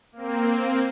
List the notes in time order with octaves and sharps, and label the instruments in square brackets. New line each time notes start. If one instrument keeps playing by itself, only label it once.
[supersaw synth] A#3 C4